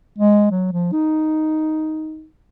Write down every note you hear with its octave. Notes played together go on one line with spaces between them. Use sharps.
G#3
F#3
F3
D#4